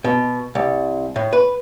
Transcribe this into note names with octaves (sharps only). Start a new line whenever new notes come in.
B2
C2
A2
B4